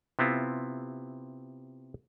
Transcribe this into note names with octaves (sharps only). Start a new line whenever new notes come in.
C3 B3 C4 E4 F4